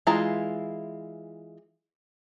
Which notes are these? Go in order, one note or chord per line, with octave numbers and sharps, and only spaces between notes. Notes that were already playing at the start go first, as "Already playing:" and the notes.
E3 G#3 E4 F4 A#5